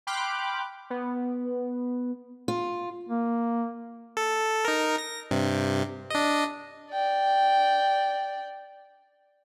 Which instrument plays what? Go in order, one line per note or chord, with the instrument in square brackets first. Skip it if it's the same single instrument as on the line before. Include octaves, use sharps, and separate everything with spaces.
[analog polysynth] G5 B5 C6 D6 F6 F#6
B3
[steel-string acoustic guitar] F4
[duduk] A#3
[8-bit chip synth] A4
D#4 A#4
A#6
G2 C3
D4 D#5
[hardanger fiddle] D5 G5